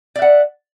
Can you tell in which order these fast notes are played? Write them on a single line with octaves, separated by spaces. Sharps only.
D5 E5 F#5